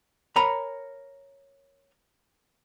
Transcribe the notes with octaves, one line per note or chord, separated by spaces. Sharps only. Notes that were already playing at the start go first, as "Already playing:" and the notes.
A#4 C#5 G#5 A#5 B5